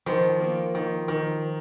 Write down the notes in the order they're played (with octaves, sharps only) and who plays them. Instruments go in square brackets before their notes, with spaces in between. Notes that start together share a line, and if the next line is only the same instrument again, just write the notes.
[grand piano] D#3 [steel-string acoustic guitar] F3
[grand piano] A#3
D#3
D#3